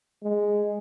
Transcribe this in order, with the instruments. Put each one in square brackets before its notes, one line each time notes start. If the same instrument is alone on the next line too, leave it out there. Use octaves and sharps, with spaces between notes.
[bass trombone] G#3